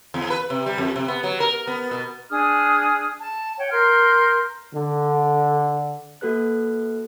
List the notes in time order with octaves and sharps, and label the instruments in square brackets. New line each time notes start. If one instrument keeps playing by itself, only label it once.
[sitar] E2
B4
C3
G3
F2
C3
B3
F#3
A#4
B3
B2
[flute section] D4 G#4 D#6 F6
A5
C#5 F#5 G5
A#4 C6 F6 G6
[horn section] D3
[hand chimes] A#3 F#4 A4 B4 F#6